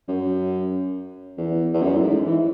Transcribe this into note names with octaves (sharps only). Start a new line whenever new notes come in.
F#2
E2
E2
F#2
A2
G#2
E3